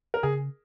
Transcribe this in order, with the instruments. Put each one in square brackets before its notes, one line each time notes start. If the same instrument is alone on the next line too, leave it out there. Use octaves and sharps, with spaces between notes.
[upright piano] A#4
[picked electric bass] C#3 [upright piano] G#4